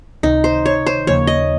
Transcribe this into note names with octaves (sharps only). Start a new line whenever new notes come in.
C#2 C3 D#3 D#4
C5
C#5
C5
D#2 C#3 F3 A#3 C#5
D#5